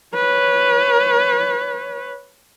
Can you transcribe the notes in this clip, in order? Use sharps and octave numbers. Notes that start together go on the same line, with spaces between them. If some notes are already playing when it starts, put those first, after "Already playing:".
B4 C#5